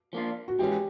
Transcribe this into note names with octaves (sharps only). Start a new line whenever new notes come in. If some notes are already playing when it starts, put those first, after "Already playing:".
F3 A#3 D4 F4
F#4
E3 G#3 C#4 G4